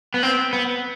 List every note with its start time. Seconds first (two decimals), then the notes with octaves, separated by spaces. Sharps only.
0.14 B3
0.23 C4
0.53 B3